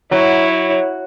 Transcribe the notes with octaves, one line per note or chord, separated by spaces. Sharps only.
F#3 E4 C#5